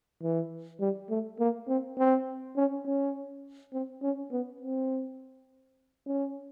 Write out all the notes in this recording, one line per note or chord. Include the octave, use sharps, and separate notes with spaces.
E3
G3
A3
A#3
C4
C4
C#4
C#4
C4
C#4
B3
C4
C#4